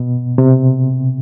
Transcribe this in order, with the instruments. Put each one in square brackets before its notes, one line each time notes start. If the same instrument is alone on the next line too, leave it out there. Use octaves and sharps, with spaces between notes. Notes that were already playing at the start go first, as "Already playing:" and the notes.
Already playing: [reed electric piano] B2
C3